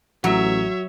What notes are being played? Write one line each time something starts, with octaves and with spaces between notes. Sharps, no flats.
A1 F#3 F#4 C#5 E5